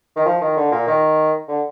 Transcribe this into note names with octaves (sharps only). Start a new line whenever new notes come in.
D#3
F3
D#3
D3
A#2
D#3
D3